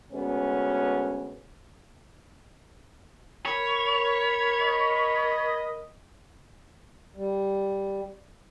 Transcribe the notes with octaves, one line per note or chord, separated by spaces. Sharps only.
D2 G#3 B3 C#4
A#4 C#5 B5
D#5
G3